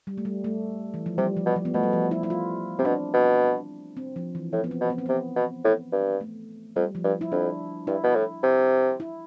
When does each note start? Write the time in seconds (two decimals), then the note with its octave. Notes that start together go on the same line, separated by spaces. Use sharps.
0.07 G3
0.18 A3
0.25 G3
0.44 A3
0.94 E3
1.06 F3
1.18 C3 G3
1.37 F3
1.46 B2
1.56 F3
1.65 B3
1.74 B2 A3
1.83 G3
1.93 F3
2.11 E4
2.23 E4
2.30 F4
2.79 C3 C4
2.85 B2 D4
3.14 B2
3.97 C4
4.16 F3
4.35 E3
4.53 A2 F3
4.64 B3
4.71 C4
4.81 B2
4.90 B3
4.98 C4
5.06 C3 B3
5.36 B2
5.64 A2
5.92 G2
6.21 A3
6.76 F2 G3
6.95 F3
7.04 G2
7.21 E4
7.32 F2 D4
7.87 G2 E4
8.04 B2
8.16 A2
8.43 C3
9.00 E4